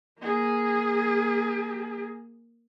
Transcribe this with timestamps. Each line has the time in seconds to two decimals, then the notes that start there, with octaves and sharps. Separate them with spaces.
0.19 A#3 G#4